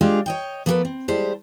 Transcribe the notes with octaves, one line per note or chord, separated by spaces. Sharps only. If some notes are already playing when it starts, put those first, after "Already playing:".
G#3 D4 F4 G4 G#4
C#5 D#5 G5
F3 A#3 B3 G#4 A4 B4
C4
G3 G#3 E4 C5 A5